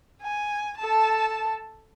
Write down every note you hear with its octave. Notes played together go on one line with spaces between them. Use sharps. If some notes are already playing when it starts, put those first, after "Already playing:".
G#5
A4 A5